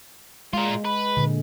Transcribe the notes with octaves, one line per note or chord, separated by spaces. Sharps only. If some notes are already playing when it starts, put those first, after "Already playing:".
A#2 G#3 F4
B4
A#2 D3